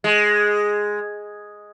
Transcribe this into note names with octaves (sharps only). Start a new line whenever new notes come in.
G#3